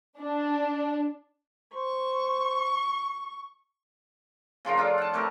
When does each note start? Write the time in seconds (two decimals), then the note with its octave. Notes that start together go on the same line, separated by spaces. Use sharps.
0.19 D4
1.74 C5 C#6
4.65 C#3 F3 F4 A#4
4.77 D4 F4 A4
4.98 F#5 A5
5.13 C3 A3 G4 A#4